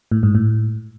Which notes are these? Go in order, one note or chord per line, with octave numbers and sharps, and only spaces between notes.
A2
G#2
A2